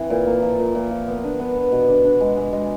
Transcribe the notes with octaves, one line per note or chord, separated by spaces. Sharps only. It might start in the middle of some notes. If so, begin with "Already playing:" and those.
Already playing: E3 C4
A#2
A#3
F3
A#2
A#2
F3
B3
D4
B3
B3
B2
D4
D4
G#3
G#3
G#3